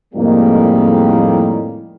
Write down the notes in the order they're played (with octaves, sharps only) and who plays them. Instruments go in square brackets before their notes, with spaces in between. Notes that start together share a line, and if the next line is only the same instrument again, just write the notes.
[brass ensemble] F2 A2 D#3 G3 G#3 A#3